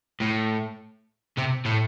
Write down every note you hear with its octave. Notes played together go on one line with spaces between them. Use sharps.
A2
C3
A2